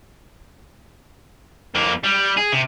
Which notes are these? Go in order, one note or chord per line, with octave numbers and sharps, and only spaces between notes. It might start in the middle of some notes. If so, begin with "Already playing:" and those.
F2 A#3
G3
G#4
C3